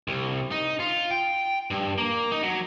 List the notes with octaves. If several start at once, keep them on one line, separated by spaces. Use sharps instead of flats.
C2
D#4
F4
G5
G2
A#3
D#4
F#3